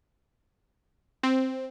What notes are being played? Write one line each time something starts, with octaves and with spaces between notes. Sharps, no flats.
C4